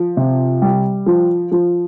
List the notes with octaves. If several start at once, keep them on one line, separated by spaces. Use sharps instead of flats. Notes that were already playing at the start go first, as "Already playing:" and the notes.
Already playing: F3
C3
G3
F3
F3